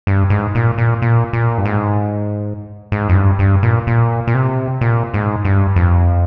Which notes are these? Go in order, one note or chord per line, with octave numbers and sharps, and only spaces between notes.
G2
G#2
A#2
A#2
A#2
A#2
G2
G#2
G#2
F2
G2
G2
A#2
A#2
A#2
C3
A#2
G#2
G2
F2